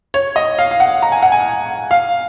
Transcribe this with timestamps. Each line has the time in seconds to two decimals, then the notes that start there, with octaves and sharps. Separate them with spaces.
0.14 C#5
0.36 D#5
0.59 F5
0.71 F5
0.80 F#5
1.02 A#5
1.12 G#5
1.23 F#5
1.32 G#5
1.91 F5